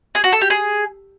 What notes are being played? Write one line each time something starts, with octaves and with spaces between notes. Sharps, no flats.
G#4
F#4
A4
G4
G#4